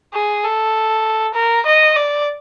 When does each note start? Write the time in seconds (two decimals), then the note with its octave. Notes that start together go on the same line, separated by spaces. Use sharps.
0.14 G#4
0.44 A4
1.35 A#4
1.66 D#5
1.96 D5